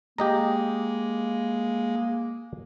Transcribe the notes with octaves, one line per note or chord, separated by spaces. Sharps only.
G#3 A#3 G4 D#5 A#5